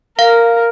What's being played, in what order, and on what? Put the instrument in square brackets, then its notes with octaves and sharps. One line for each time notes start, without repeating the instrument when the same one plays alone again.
[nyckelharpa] A#4 [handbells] F5